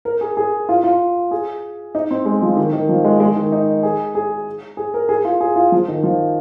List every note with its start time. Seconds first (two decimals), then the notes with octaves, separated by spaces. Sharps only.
0.05 A#4
0.21 G#4
0.37 G#4
0.69 F4
0.84 F4
1.31 G#4
1.95 D#4
2.11 C4
2.26 G#3
2.42 F3
2.57 D#3
2.73 D#3
2.89 F3
3.05 G#3
3.20 G#3
3.36 D#3
3.52 D#4
3.83 G#4
4.15 G#4
4.77 G#4
4.94 A#4
5.09 G#4
5.25 F4
5.41 G#4
5.56 F4
5.72 F3
5.88 D#3
6.03 F3